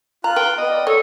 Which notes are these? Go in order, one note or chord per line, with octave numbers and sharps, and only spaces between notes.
F4 A#5 F#6
B4 G5
B3 D#5
D5
A4 C#5 D#5